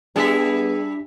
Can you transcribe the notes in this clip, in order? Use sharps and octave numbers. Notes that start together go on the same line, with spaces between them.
G3 B3 D4 E4 G#4 A4 B6